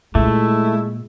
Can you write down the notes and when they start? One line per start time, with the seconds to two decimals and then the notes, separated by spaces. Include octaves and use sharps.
0.15 A#2 G#3 A3 E4